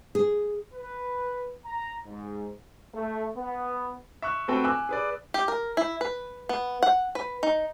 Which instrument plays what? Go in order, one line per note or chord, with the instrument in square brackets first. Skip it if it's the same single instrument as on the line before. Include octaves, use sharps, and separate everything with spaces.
[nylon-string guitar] G#4
[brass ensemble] B4
A#5
G#2
[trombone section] A3
B3
[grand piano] E5 C#6 F#6
A3 C4 F#4 A4 B4 G5
G#5 D6 E6 F#6
G#4 B4 D5
[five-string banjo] G4
A#4
E4
B4
B3
F#5
B4
D#4